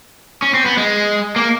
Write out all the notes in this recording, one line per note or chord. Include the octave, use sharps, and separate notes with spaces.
C#4
C4
B3
G#3
A#3